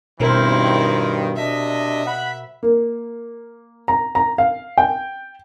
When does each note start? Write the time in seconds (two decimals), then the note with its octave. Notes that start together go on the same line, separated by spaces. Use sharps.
0.20 G2 B2 D#3 C4 E4 A#4 C5
1.37 C3 D4 D#5 E5
2.06 F#5 B5
2.63 A#3
3.88 A#5
4.15 A#5
4.38 F5
4.78 G5